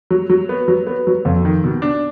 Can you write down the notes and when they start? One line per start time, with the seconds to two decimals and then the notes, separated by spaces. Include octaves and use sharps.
0.11 F#3
0.30 F#3
0.49 B3
0.68 F#3
0.87 B3
1.07 F#3
1.25 F2
1.45 D#3
1.64 B2
1.82 D4